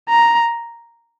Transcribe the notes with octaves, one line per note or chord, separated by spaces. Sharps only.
A#5